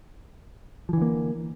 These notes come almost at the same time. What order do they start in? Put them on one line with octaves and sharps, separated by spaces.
F3 E3 D3 A#3